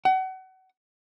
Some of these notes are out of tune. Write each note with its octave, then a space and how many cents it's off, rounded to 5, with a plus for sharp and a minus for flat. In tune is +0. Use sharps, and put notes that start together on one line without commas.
F#5 +30